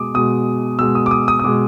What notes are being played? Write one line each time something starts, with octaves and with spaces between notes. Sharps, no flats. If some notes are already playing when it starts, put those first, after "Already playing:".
Already playing: B2 G#3 D6 D#6
B2 G#3 D#6
B2 G#3 E6
D#6
D6
D#6
D#6
D#6
B2 G#3 D6